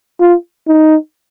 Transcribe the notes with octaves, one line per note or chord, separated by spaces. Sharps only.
F4
D#4